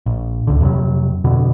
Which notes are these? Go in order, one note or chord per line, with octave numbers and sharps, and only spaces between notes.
A#1
D1 C#2 D3
F2 C3 E3 F#3
F2 B2 D3